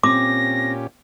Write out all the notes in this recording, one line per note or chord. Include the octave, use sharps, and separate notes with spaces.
A#2 C4 C#4 G4 D6 A#6